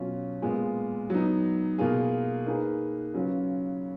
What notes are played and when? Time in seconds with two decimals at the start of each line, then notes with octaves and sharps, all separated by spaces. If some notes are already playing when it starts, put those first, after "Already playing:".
Already playing: B2 F#3 C#4 F4
0.42 A#2 G#3 B3 F4
1.10 F#3 B3 D#4
1.78 B2 A#3 F4 G#4
2.47 A#3 D#4 G#4 B4
3.14 C#3 F#3 C#4 F4 B4